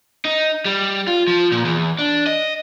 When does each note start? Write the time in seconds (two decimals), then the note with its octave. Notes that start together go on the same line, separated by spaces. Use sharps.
0.25 D#4
0.65 G3
1.07 F4
1.28 F3
1.52 A#2
1.65 E2
1.99 D4
2.27 D#5